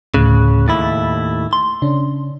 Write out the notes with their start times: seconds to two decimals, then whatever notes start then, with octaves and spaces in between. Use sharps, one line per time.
0.14 D2 A2 C#3 F#6
0.68 D#2 A2 E4 B5 A6
1.53 C6
1.82 C#3 C#4 D4